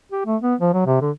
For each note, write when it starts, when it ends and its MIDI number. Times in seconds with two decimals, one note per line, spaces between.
0.12 0.23 67
0.26 0.36 57
0.42 0.55 59
0.61 0.72 53
0.73 0.84 54
0.86 0.99 48
1.01 1.11 50